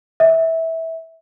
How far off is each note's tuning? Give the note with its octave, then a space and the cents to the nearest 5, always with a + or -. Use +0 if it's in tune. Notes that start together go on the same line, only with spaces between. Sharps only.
E5 -15